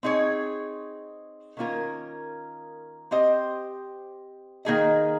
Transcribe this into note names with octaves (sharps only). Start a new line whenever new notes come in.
C4 D#4 G#4 C#5
D#3 A#3 C#4 F4 A#4
C4 G4 C5 D#5
D#3 A#3 D#4 G#4 D#5